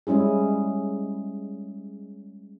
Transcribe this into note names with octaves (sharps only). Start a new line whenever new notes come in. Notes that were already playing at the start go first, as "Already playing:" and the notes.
G3 G#3 C#4 E4 G#4